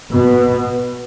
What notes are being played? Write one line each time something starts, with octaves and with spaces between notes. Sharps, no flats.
B2 B3